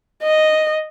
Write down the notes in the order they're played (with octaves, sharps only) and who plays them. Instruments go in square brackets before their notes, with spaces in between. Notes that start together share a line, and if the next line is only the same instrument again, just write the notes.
[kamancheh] D#5